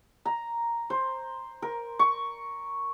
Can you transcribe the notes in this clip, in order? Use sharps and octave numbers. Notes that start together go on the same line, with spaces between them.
A#5
C5
A#4
C#6